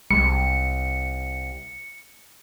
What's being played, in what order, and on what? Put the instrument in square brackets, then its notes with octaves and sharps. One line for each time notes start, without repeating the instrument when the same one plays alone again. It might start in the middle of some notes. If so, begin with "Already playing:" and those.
[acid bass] C2 [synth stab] G3 G#3 [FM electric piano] C#7